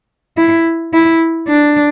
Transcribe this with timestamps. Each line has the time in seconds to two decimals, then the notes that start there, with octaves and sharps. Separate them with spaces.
0.38 E4
0.94 E4
1.48 D4